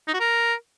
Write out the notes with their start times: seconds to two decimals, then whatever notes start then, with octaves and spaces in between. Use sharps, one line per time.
0.08 D#4
0.14 F#4
0.20 A#4